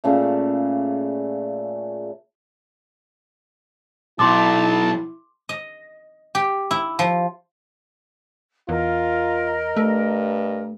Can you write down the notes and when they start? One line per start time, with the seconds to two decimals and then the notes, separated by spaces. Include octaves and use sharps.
0.04 A#2 C#3 A3
4.19 B1 E4 A5 C6 D6
5.49 D#5
6.35 G4
6.71 E4
6.99 F3
8.69 E2 F4 A#4 D#5
9.77 G2 A3